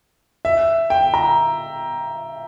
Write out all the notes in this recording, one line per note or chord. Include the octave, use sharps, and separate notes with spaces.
E5
G5
A#5